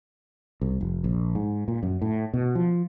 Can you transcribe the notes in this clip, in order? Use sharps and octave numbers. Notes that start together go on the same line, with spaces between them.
C2
F1
A#1
G#2
A#2
F#2
A2
B2
F3